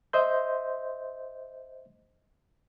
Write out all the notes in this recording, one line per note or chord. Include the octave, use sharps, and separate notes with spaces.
C5 D#5 E5 C6 G6